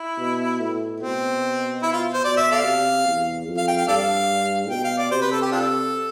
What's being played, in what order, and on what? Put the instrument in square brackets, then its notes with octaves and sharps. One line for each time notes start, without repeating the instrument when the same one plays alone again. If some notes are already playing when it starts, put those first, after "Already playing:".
Already playing: [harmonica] E4
[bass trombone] B2
A2
[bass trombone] B2 [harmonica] C4
[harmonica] E4
F4
C5
[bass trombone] B2 [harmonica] D5
[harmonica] E5
A4 D5 F5
[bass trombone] C3
E2
F2
[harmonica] F5
G5
F5
[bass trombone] G2 [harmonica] A4 D5 F5
[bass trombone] B2 [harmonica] G5
[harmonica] F5
D5
[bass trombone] C3 [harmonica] C5
[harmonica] B4
A4
G4
D4 F4 A4